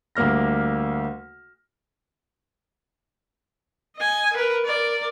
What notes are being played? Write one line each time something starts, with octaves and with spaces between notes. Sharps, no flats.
D2 G3 A#3 F6 A#6
D#5 G#5
A#4 B4
A#4 D5